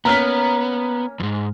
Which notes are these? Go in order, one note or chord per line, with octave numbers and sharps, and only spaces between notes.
A#3 B3 C#4 F5 A#5 F6 B6
E2 G#2